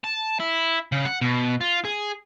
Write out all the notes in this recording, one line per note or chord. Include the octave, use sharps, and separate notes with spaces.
A5
E4
C#3
F#5
B2
F4
G#4